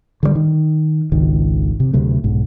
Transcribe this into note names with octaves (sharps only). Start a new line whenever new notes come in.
D3 E3 G3
D#3
G#1 C#2 D#3
C3
D2 C3 F#3 A3
B1 G#2